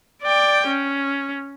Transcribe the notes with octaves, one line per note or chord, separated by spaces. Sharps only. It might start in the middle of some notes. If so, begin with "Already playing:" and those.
D5 G5
C#4